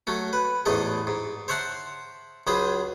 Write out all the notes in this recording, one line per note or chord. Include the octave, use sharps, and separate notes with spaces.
F#3 A3 C#4
B4
A1 E2 G#2 A3 G#4 D#5
G#2
C5 C#5 E5 F#5 A5 C6
C#2 F#3 G#4 C5 B5 D#6